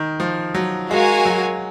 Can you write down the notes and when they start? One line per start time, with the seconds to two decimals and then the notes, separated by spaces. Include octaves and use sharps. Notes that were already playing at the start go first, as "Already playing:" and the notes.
Already playing: D#3
0.20 F3
0.54 F#3
0.90 G#3 F#4 A#4 F5 G#5
1.25 F#3